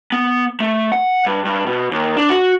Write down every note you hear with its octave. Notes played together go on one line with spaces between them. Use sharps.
B3
A3
F#5
G2
G2
B2
D#2
D4
F#4